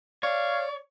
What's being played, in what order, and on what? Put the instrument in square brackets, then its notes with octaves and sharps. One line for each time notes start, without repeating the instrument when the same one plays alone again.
[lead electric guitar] C#5 [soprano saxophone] D5 [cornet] F5